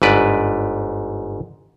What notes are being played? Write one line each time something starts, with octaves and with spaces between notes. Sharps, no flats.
G1 G#2 B4 D5